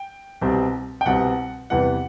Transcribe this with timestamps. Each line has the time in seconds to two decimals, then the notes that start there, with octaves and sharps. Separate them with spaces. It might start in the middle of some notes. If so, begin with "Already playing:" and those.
Already playing: G5
0.41 C2 B2 G3 C4
1.01 G5
1.06 C2 B2 G3 C4 F#5
1.70 E2 C3 E3 G3 B3 F#5